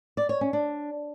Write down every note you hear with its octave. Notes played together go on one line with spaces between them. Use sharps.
D5
C#5
C#4
D4